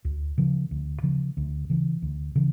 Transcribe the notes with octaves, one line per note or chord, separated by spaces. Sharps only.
D2
C#3 F3
D2
C#3 F3
D2
C#3 E3
D2
C#3 E3